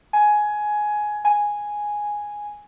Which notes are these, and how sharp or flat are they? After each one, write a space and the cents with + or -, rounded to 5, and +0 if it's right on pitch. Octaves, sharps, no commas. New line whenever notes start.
G#5 +15
G#5 +0